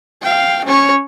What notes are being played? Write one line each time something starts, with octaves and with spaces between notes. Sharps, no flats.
F5 G5
C#4 C#5